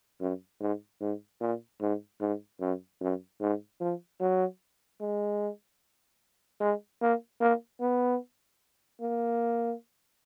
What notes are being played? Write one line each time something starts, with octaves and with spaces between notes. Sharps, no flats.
F#2
G#2
G#2
A#2
G#2
G#2
F#2
F#2
G#2
F3
F#3
G#3
G#3
A#3
A#3
B3
A#3